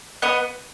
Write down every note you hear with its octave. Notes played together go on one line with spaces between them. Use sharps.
B3 D#5 F#5